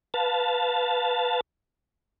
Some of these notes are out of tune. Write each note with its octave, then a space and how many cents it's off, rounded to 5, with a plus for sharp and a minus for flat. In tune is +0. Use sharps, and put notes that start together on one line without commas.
B4 +0 F5 +15 A5 +0